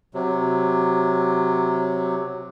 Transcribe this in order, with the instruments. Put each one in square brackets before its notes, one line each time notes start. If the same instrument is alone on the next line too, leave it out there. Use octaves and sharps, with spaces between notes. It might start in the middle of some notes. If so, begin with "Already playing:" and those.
[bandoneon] C3 F#3